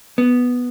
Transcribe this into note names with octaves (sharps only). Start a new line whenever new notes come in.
B3